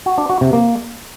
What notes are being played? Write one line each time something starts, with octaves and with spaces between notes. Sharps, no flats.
F#4
D4
F#4
C3
A#3